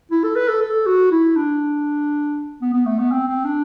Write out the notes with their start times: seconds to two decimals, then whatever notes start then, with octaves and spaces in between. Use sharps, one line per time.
0.11 E4
0.23 A4
0.36 B4
0.49 A4
0.61 A4
0.86 F#4
1.11 E4
1.36 D4
2.61 B3
2.73 B3
2.86 A3
2.99 B3
3.11 C4
3.28 C4
3.45 D4